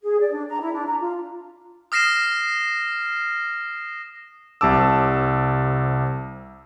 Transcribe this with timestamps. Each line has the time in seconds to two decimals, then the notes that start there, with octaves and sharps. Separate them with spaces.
0.03 G#4
0.19 D5
0.32 D4
0.49 A#5
0.61 E4
0.73 D4
0.87 A#5
1.00 F4
1.92 D#6 F6 A#6 C7 E7
4.61 C2 C3 A5 D6 E6